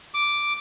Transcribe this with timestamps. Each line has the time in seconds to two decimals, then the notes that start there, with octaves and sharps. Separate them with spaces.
0.14 D6